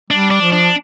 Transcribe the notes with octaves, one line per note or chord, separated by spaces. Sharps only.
G3 D4
D4
F3
D4